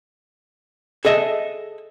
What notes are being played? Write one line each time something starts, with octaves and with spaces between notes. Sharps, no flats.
G#4 A4 D#5 E5